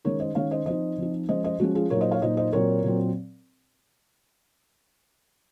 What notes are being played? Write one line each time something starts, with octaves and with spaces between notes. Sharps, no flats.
D#3 G#3 C#4 A#4 C#5
C5 D#5
D#3 G#3 C#4 C#5 F5
C5 D#5
F3 C4 D#4 C5 D#5
F3 C4 D#4
F3 G#3 C#4 C5 D#5
C5 D#5
F3 G#3 C#4 F#4
F4 G#4
A#2 F#3 A#3 D#4 A#4 C#5
C5 D#5
C#5 F5
A#2 F#3 A#3 D#4 C5 D#5
C5 D#5
A#2 F#3 C4 A#4 C#5
A#2 F#3 C4